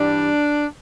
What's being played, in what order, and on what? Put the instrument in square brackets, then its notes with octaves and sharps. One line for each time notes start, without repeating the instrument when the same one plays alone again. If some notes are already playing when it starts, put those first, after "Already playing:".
Already playing: [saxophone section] G2 E3 G3 D4